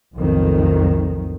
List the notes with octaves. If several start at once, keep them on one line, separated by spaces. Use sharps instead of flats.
B1 F2 A2 D#3